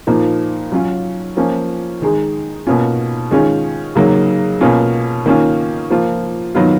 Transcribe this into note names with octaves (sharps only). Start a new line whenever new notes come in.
A#2 F3 A#3 D#4
F#3 C#4 F4
F3 A#3 C#4 F4
D#3 G#3 D#4
B2 A#3 C#4 F4
D#3 G#3 C#4 F4
C#3 F#3 A#3 D#4
B2 A#3 C#4 F4
D#3 A#3 C#4 F4
F3 A#3 F4
D#3 F#3 B3 F4